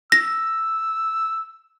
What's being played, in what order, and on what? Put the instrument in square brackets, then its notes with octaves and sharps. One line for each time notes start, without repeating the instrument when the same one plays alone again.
[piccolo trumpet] E6 [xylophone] A#6